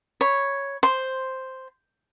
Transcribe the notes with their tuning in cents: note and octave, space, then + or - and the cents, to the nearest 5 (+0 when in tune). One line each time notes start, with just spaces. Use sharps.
C#5 +0 B5 +0
C5 +0 C6 +0